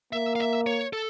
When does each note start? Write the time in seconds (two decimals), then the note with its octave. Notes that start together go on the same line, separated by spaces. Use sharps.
0.13 A#3 E5
0.36 F5
0.40 E5
0.66 C#5
0.93 A4